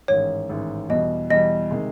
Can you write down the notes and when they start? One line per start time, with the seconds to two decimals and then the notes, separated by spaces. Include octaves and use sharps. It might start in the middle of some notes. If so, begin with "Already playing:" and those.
0.08 A1 G#2 D#3 C#5
0.49 A1 G#2 D#3
0.89 E2 B2 G3 D#5
1.30 E2 B2 G3 D#5
1.71 C3 D#3 G#3